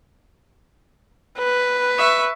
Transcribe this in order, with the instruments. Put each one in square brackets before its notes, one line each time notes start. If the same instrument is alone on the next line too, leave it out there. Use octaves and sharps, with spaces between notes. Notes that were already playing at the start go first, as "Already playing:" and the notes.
[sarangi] B4
[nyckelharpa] E5 C#6